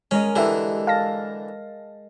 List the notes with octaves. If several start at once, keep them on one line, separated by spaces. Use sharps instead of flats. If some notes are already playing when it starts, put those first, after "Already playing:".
G#3 C#4 A#4 D#5
D3 E3 G4 E5
F5 A5 A#6